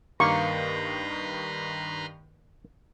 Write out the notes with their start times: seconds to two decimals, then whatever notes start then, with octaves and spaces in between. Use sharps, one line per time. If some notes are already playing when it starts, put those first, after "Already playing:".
0.20 G2 D#3 A#3 B4 A#5 C6 C#6